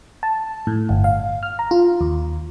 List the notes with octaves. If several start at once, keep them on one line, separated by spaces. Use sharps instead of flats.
A5
A2
G1
F5
F6
A#5
F4
D#2